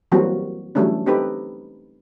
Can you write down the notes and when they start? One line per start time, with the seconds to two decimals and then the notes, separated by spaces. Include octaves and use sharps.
0.12 E3 F#3 G3 A#3 C4 F#4
0.75 E3 F#3 G3 A3 C#4 D4
1.06 C4 D#4 G4 A4 B4